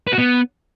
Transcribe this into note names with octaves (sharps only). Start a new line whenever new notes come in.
B4
F#4
B3